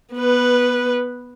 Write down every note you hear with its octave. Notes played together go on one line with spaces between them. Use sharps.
B3 B4